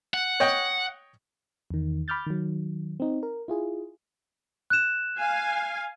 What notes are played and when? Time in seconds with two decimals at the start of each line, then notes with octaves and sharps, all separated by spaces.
0.14 F#5
0.40 C#5 D#5 G5
1.70 E2 D#3
2.08 B5 D6 F6 G6 A6
2.27 D#3 F#3
3.00 C4 D#4
3.23 A#4
3.48 E4 F4 G#4
4.70 F#6 E7
5.18 F5 G#5